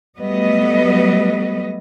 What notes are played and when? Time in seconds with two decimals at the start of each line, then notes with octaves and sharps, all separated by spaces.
0.19 F#3 G3 A3 B3 B4 D#5